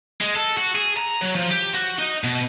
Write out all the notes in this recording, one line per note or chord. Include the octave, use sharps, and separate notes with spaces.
G#3
A4
F#4
G#4
A#5
F#3
F3
G4
F#4
D#4
B2